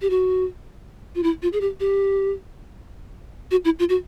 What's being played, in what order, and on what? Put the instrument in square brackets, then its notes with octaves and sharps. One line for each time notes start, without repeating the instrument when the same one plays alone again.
[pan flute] G4
F#4
F4
E4
F4
G#4
G4
G4
F#4
E4
F4
F#4